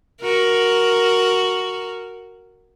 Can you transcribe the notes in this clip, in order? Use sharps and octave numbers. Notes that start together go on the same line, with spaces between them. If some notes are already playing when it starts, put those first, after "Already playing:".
F#4 A#4